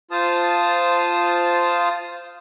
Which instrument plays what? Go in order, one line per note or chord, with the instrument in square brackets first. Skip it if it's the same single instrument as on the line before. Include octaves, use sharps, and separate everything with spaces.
[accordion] F4 C5 F5 A5 D#6